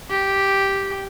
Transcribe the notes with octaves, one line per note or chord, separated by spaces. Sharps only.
G4